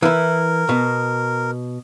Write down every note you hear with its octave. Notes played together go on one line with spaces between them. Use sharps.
E3 E4 A#4
B2